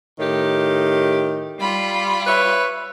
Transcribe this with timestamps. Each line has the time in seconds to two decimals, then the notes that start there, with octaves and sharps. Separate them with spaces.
0.19 A2 D#3 G4
1.59 G3 F4 B5
2.26 B4 C#5 E5